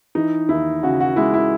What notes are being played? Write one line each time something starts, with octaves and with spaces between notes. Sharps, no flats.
E3 D#4
D#2 E4
C#3 F#4
F#4
G#3 E4
E4